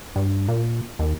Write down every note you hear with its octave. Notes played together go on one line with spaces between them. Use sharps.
G2
A#2
D#2